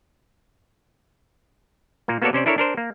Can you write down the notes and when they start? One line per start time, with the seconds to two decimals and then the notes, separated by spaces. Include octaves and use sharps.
2.08 A#2 A#3
2.22 A#3 B3 F#4 A4 C#5 D5
2.33 C3 C#4 C5 D5
2.46 D4 E4 A4 A#4 C#5
2.58 D4 A#4 C5
2.77 A#3